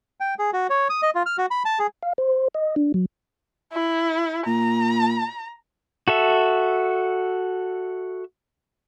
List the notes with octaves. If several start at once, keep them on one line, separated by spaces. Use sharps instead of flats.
G5
G#4
F#4
C#5
D#6
D#5
F4
F6
F#4
B5
A5
G#4
F5
C5
D#5
D4
F#3
E4
A#2 A#5
F#4 A4 E5